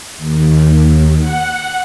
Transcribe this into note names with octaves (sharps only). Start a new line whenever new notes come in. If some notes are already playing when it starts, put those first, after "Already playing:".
D#2
F#5